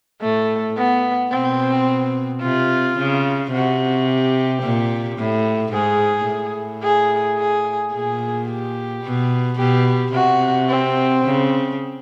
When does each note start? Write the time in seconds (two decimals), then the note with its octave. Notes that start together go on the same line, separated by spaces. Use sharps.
0.22 A2 A3
0.77 B3
1.32 B2 C4
2.41 C3 F4
2.98 C#3
3.52 C3 F#4
4.07 G4
4.62 A#2
5.18 A2
5.73 G#2 G#4
6.28 A2
6.83 G#4
7.38 G#4
7.93 A#2 G#4
8.48 G4
9.03 B2
9.58 B2 G4
10.14 C3 F#4
10.69 C4
11.24 C#3